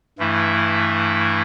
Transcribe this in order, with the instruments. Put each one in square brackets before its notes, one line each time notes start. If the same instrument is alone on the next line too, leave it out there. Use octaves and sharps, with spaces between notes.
[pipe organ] G2 E3 A3 E4